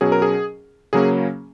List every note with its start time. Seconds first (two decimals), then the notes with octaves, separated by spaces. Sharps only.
0.01 B2 F#3 C#4 G#4
0.12 A#4
0.22 G#4
0.93 C#3 F#3 A#3 C#4 G#4